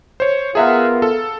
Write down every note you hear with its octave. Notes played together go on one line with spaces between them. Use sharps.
C5 C#5
B3 F4 G#4 A#4 E5 F#5
A4